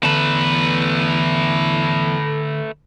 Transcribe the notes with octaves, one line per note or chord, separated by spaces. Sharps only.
E2 D3 A3 B4 A5